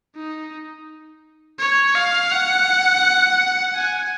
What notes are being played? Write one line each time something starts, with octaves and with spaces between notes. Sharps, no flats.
D#4
C#5
F5
F#5
G#5